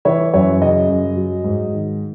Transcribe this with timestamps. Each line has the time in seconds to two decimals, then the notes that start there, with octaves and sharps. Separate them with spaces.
0.05 E3 C#5 E5
0.34 F#2 C#5 E5
0.61 C#3 D#5
0.89 F#2
1.17 F#3
1.44 G#2
1.73 D#3